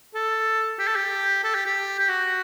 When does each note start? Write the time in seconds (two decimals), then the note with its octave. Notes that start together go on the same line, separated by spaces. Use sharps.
0.15 A4
0.79 G4
0.87 A4
0.96 G4
1.44 A4
1.55 G4
1.66 G4
2.00 G4
2.09 F#4